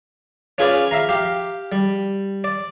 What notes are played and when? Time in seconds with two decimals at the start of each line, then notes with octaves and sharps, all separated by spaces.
0.58 C#4 F4 G#4 B4 C#5 D5
0.91 E5 F5 A#5
1.09 G4 F5
1.72 G3
2.44 D5